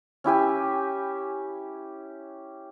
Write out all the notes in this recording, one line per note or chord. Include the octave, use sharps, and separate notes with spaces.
C#4 E4 G4 G#5